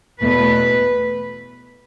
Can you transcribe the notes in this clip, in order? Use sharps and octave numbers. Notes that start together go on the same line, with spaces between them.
E2 B2 A3 B4